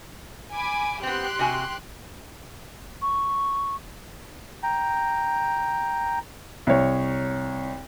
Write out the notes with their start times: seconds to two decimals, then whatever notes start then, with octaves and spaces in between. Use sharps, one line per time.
0.52 G#5 B5 D6
1.03 B3 C4 G4 C6 F#6
1.39 C3 F#4 G#5
3.02 C#6
4.63 G5 A#5
6.67 C2 C#5